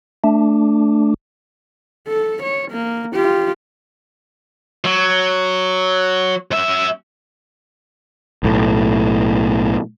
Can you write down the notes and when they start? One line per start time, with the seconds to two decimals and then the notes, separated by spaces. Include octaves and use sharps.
0.24 A3 D4
2.07 A4
2.43 C#5
2.72 A#3
3.13 F4 G4
4.85 F#3
6.51 F#2 E5
8.43 B1 A2